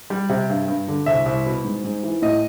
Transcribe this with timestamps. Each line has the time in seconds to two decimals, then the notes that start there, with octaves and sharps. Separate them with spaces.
0.10 G3
0.29 C3
0.50 G2
0.68 G2
0.88 D3
1.06 C2 E5
1.26 C2
1.46 B2
1.65 G#2
1.84 G#2
2.03 E3
2.22 A2 D#5